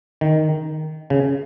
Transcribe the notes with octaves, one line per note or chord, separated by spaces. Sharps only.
D#3
C#3